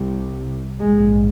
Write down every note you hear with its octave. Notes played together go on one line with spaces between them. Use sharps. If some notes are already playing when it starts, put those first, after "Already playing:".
Already playing: C2 C3
A#1 G#2 G#3